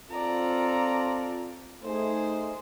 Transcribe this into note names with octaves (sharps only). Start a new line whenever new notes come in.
C4 F4 A4 D5 A#5
A3 D#4 G#4 C5